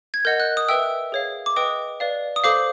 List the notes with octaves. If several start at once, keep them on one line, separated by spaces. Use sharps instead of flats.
G#6
A#4 D#5 F#5 G6
F#6
D#6
B4 E5 G5 E6
G#4 C#5 F5
D6
B4 D#5 G5 D#6
B4 D5 F5
D#6
A4 C5 F5 D6